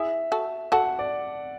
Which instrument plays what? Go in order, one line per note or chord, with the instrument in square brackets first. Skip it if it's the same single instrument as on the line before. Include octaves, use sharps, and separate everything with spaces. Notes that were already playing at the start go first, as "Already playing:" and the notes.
Already playing: [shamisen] E4 G#4 [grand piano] E5
[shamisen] F#4 A4
[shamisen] F#4 A4 [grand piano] F#5
[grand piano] D5